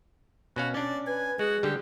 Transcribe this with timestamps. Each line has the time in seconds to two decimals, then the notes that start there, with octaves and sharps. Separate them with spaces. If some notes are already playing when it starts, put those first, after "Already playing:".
0.56 B2 C#4 F#4 F5
0.74 C#4 D4 D5
1.07 B4 G#5
1.39 G#3 F#4 G#4
1.63 D3 G3 G4